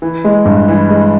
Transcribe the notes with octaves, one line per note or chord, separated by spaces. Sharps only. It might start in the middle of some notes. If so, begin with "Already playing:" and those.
E3
G#3
G2
E3
G#3